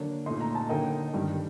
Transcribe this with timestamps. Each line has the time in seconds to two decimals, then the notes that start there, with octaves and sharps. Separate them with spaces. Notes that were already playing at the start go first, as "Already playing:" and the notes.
Already playing: D3 F#3 A#3 D4
0.26 A#2 A3 D#4 C6
0.40 A#5
0.55 A5
0.69 D3 F#3 A#3 D#4 G5
1.14 G2 D#3 G3